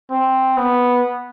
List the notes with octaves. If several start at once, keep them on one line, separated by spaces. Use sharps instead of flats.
C4
B3